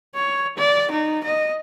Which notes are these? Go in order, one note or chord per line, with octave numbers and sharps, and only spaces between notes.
C#5
D5
D#4
D#5